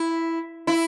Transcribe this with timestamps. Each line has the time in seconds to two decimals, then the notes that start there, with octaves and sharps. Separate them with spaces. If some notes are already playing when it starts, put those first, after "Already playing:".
Already playing: E4
0.67 E4